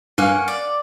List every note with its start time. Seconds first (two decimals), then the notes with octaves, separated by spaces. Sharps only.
0.18 G2 A#3 C#4 F5 F#5
0.48 D5